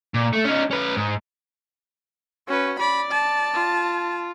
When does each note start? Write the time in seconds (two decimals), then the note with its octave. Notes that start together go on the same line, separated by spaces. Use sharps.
0.14 A#2
0.33 A3
0.44 C#4 D#4
0.71 C#4 B4
0.97 G#2
2.48 C#4 F#4 B4
2.79 D5 B5
3.11 A5
3.53 F4